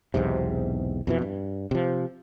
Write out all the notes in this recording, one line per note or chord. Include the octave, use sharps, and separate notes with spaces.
B1 E2 G#2 C3
F2 B2 E3
G2
C3 F3